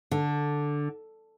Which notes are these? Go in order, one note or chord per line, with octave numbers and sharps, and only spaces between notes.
D3